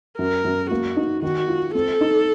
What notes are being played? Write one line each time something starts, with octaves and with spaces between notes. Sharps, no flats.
F#2 A#4
F#2
A#3 F#4
D#4
D#3 F#4
F4
C4 A4
D#4